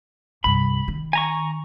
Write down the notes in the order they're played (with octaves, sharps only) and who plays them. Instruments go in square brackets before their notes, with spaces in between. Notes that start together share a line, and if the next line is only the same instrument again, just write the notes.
[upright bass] C2 G2 [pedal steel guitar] B5
[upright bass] D#3
[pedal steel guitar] G#5 A#5 C#6